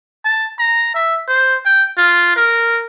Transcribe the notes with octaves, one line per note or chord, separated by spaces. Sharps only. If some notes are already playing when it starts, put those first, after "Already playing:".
A5
A#5
E5
C5
G5
F4
A#4